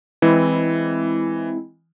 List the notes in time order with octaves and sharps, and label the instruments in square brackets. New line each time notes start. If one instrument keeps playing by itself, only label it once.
[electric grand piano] E3 [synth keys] G#3 C4 E4